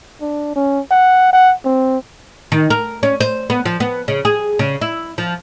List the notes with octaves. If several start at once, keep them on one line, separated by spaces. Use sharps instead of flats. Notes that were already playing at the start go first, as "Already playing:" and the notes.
D4
C#4
F#5
F#5
C4
D#3
A#4
C#4
C5
B3
F3
B3
C#3
G#4
C#3
E4
F3